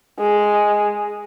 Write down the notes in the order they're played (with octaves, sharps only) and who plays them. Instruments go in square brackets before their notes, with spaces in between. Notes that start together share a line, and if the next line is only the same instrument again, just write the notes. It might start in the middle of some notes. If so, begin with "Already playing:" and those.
[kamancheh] G#3